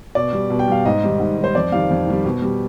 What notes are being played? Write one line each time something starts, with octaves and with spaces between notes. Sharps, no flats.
B2 D5
G3
B2
G5
G3 F5
G#2 D#5
D#3 G3
G#2
D#3 G3
C5
F2 D5
D#3 G3 F5
F2
D#3 G3
B2
G3